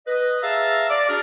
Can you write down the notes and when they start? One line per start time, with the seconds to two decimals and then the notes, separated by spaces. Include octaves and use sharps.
0.07 B4 D#5
0.43 G#4 E5 F5 A5 A#5 E6
0.89 D5
1.09 D4 F#4 G#4 A#5 F6